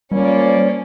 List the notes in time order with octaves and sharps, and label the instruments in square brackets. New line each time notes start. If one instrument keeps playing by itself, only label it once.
[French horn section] F3 A#3 D5 [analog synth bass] G3 [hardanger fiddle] C#4